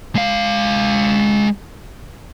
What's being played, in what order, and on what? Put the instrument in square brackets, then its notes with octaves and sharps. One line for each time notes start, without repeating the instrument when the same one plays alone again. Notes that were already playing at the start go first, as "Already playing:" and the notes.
[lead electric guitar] G#3 F5